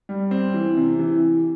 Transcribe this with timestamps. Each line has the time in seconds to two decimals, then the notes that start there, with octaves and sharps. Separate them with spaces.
0.09 G3
0.31 C4
0.54 E3
0.77 C3
0.99 E3